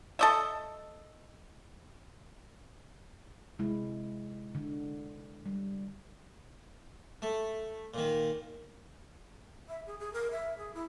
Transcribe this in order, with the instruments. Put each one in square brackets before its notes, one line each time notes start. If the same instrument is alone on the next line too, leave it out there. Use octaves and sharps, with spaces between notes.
[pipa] A4 D#5 E5
[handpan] C3 G#3 E4
D3
G3
[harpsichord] A3
A#2 D#3
[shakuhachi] E5
G#4
G#4
A#4
E5
G#4
E4